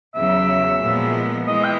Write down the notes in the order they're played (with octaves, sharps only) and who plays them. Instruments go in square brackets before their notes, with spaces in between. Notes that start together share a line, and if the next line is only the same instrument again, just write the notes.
[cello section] E2 C#3 F#3 [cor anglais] E5
[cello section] A#2 F3 G#3 B3
[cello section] E3 G#3 [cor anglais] D#5
[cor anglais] G5